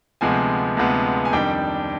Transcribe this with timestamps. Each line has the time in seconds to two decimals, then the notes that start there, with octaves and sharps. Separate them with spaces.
0.21 D2 C3 F3 G#3 B3 G#5
0.77 D2 C3 F3 G#3 B3
1.25 G#5
1.33 F2 D#3 G3 D4 G5